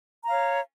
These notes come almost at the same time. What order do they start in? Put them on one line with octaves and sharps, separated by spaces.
A#5 F5 C#5